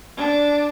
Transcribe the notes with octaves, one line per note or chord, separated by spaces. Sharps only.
D4